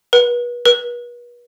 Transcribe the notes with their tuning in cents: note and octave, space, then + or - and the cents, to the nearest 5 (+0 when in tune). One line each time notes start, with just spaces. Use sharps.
B4 -35
B4 -40